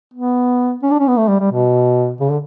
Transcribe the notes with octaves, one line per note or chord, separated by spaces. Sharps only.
B3
C#4
D4
C#4
B3
A3
G3
G3
B2
C#3
D3